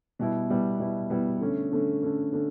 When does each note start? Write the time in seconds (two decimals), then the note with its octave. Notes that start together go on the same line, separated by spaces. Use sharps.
0.19 B2 G3 B3 E4
0.50 B2 G3 B3 E4
0.80 B2 G3 B3 E4
1.10 B2 G3 B3 E4
1.41 D3 A3 C#4
1.71 D3 A3 C#4
2.02 D3 A3 C#4
2.33 D3 A3 C#4